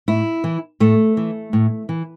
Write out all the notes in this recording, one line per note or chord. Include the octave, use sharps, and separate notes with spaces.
A2 E4
E3
A2 A3
E3
A2
E3